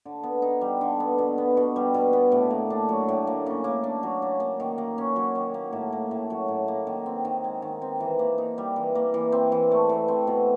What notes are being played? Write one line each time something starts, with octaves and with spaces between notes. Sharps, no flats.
D3
B3
D#4
G3
D3
B3
B2
B3
B2
G3
B2
B3
A2
A#3
D4
F#3
A2
A#3
C#3
A#3
D4
F#3
C#3
A#3
D#3
A#3
C#4
F#3
D#3
A#3
A2
A#3
A2
F#3
A2
A#3
D#3
C4
D#3
G#3
D#3
C4
E3
A#3
D#4
G3
E3
A#3
E3
C4
E3
A3
E3
C4
B2